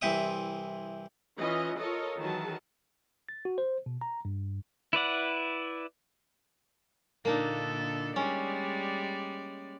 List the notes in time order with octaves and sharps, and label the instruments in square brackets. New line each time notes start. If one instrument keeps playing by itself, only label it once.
[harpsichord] C2 E3 C4 E5 D#6
[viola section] E3 C#4 F4 D#5
F4 A4 A#4 C#5 D#5
D#3 E3 F#3 G#4 A5
[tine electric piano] A6
F#4
C5
B2
A#5
G2
[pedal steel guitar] E4 B4 D5 F#5
[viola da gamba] A#2 D3 A4 [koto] A#3 D4 D#4
[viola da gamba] G3 G#3 D5 [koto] C#4